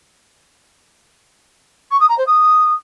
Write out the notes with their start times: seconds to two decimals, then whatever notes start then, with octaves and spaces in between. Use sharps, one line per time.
1.90 C#6
1.99 D#6
2.08 A#5
2.17 C5
2.26 D#6